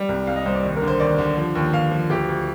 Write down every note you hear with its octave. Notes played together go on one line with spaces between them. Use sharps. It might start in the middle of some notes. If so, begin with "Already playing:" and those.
Already playing: G3
C2
C2 F5
D#5
C2 C5
D5
D#2
A#4
D3
C5
D#2 D5
D3
F3
D#2
D#2 F5
F3
D2 G4
D2